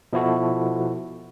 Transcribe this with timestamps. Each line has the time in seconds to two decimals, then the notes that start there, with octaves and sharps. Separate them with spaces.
0.13 B2 F3 E4 F#4 A4